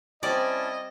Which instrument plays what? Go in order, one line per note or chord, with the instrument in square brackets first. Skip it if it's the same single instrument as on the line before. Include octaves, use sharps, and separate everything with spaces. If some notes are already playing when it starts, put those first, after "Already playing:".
[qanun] G3 C4 [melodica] C#4 E4 A5 [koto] D5 [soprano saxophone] D#5